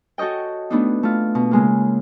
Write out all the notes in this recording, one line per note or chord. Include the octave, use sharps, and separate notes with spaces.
F#4 A4 C#5 D#5 G5
A3 B3 D4 D#4
A3 F4
B2
C#3 G#3 A#3